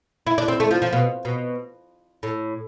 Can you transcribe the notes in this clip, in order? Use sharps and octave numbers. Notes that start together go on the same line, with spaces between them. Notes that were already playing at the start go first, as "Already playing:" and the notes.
E4
D4
C4
A3
F3
F3
B2
B2
A2